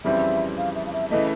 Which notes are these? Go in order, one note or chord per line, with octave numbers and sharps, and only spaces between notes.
F2 C#3 E3 G3 C4 E5
F5
E5
F5
E5
C#3 E3 A3 D#5